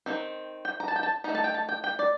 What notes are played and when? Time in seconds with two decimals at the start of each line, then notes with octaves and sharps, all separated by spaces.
0.06 D#3 F#3 C4
0.65 G5
0.80 A#5
0.88 A5
0.96 G5
1.03 A5
1.24 A3 D#4 A#5
1.35 A5
1.44 G5
1.54 A5
1.69 G5
1.84 G5
1.99 D5